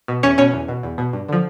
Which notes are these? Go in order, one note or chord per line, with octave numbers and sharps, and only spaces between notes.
B2
E2 C#4 C#5
B2 C#4 C#5
E2
B2
E2
B2
G2
D3 F3